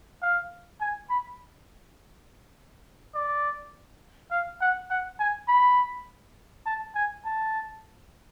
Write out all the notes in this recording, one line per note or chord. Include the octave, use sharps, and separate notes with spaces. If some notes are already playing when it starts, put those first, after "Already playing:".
F5
G#5
B5
D5
F5
F#5
F#5
G#5
B5
A5
G#5
A5